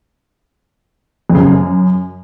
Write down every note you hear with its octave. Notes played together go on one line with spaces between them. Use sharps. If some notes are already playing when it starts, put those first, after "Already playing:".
F2
C#3
F#2